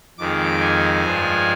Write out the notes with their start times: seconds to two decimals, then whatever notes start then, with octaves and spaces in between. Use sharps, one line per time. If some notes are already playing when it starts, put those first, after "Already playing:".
0.18 F2 D#3 G#3 D6
0.61 G#5
1.04 G2 F3 G#3